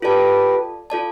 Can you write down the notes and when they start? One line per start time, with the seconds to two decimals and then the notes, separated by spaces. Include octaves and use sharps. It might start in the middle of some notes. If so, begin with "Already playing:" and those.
0.02 F4 G4 A4 B4 D5 A5
0.90 F4 A4 D5 A5